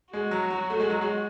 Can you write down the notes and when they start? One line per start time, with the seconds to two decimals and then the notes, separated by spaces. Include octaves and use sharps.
0.12 G#3 F#4
0.31 F#3
0.50 F#3
0.70 A3
0.80 G#3
0.90 F#3
1.01 G#3